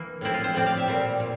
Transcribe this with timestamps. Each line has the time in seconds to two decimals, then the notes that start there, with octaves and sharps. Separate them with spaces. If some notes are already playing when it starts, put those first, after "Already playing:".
Already playing: E3 A#3
0.21 A2 F3 C4 E4
0.34 F4
0.44 C5
0.54 A2 F3 C4 D5
0.66 F5
0.77 E5
0.88 A#2 G3 C4
1.20 A#2